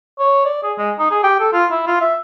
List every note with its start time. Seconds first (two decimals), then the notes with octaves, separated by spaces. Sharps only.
0.19 C#5
0.45 D5
0.63 G#4
0.78 G#3
0.99 D#4
1.11 G#4
1.23 G4
1.40 A4
1.53 F4
1.71 E4
1.87 F4
2.01 E5